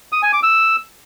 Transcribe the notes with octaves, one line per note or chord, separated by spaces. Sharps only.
D#6
G#5
D6
E6